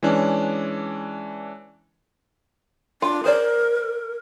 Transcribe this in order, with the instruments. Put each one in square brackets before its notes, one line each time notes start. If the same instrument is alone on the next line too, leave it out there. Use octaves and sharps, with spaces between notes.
[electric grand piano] E3 G#3 C#4 D4
[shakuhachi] D4 [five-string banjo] F4
[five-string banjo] G#4 C5 D5 [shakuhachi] A#4